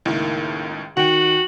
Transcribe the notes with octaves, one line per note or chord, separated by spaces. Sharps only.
C#2 A2 D#3 A#3 E4
D#3 F#4 F#5 G5 F#7